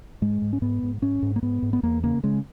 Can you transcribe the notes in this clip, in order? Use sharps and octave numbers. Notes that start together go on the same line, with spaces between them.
G#2 G#3
G#2
C#4
G#2 B3
G#2
G#2 C#4
G#2
A#3
G#2 B3
G#2
B3
E2 A#3
C#3 A#3
C#3 G#3